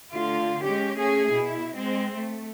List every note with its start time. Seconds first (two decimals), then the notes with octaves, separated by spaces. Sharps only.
0.14 D3 A3 F4
0.62 G#3 C#4 G4
0.99 A3 C#4 G#4
1.34 B2 E4
1.77 G#3 C4
2.15 A3